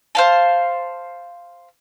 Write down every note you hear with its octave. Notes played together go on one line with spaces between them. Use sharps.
C5 F5 A5